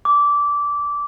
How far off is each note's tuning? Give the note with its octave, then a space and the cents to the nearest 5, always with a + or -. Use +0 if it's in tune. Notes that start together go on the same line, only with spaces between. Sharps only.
D6 -15